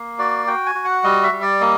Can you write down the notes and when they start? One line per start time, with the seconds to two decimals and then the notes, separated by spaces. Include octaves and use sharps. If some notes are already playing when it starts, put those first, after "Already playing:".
Already playing: A#3
0.19 F#4 D5
0.47 F#4 G5
0.66 G#5
0.75 F#4
0.85 F#5
1.04 G3 D#5
1.23 E5
1.32 G3
1.42 D5
1.61 A#3 D#5